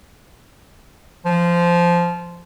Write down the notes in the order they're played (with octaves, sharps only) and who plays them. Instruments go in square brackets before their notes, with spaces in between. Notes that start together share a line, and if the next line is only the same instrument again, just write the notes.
[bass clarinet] F3